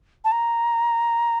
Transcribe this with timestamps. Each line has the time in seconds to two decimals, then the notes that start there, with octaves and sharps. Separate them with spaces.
0.25 A5
0.32 A#5